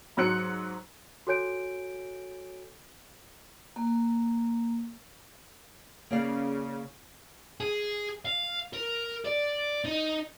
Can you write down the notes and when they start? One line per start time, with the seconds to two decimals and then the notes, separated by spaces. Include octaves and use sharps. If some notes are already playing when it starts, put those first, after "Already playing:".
0.17 G#2 F#3 F#6 C#7
1.27 F#4 A4 C#5 G#5 G6 D7
3.76 A#3
6.11 C#3 A#3 D5 F5
7.60 G#4
8.25 F5
8.73 A#4
9.25 D5
9.85 D#4